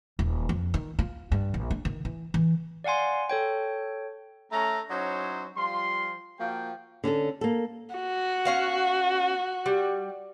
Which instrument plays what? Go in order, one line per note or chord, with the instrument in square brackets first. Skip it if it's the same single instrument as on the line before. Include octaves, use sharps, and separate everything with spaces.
[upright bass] D#1
F2
D#3
F4
G2
A#1
D4
D#3
E3
E3
[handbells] D5 F5 F#5 G#5 C6
A4 C#5 G5
[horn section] A3 C#4 A#5
F#3 C#4 D#4 E4 C5 C#5
F3 G3 F4 C6
F3 A#3 F#4 G5
[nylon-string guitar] D3 C#4 D4 A4
A#3 A4
[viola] F#4
[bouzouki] C#4 F5 F#5
G3